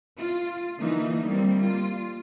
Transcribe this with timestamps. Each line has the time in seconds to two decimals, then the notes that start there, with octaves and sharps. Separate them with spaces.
0.18 F4
0.79 D3 E3 A#3 D#4
1.24 G3 A#3 C4
1.62 F4